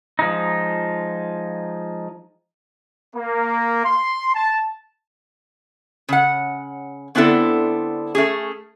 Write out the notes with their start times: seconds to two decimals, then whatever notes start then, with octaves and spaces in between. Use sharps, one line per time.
0.19 F3 G#3 D#4
3.15 A#3
3.85 C6
4.34 A5
6.09 C#3 F#5
7.15 D3 B3 C4 D4 E4 A4
8.15 A3 C#4 G#4